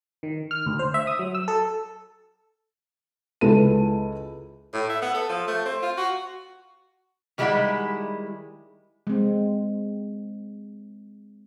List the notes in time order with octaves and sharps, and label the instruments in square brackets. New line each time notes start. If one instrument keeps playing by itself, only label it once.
[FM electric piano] D#3
F6
D2
C5
E5
D#6
F#3
E6
A4
[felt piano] C#2 E4 A4 B4 D#7
[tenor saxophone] A2
E5
B3
A4
F3
A3
C4
F4
F#4
[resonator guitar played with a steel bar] D#3 G3 G#3 E4 G4 F#5
[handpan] G#3 C4